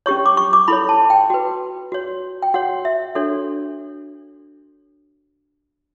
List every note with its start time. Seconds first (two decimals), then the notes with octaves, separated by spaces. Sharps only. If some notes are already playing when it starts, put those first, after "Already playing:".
0.06 C#4 G4 C#5 C#6
0.26 D6
0.37 C#6
0.53 D6
0.68 E4 A4 C#5 B5
0.89 A5
1.10 G5
1.30 F#4 B4
1.92 F#4 C#5
2.42 G5
2.54 F#4 C#5 F#5
2.85 E5
3.15 D4 F#4 A4 C#5